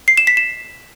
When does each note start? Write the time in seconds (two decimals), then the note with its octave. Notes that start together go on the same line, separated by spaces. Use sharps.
0.08 C7
0.18 E7
0.27 B6
0.37 E7